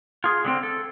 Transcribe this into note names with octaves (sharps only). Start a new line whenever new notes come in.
F4 G#4
D3 B3 C4
A4